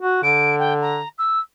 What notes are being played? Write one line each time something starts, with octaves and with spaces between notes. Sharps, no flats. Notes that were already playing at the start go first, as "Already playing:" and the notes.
F#4
D3 D7
G5
A#5
E6